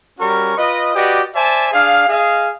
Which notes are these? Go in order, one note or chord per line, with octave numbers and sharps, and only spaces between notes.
G3 C#4 F#4 A#4 C#6
F4 B4 D#5
F#4 G4 B4 D5 D#5
C5 D5 E5 G#5 A5
D4 G#4 F5
G#4 D#5 F5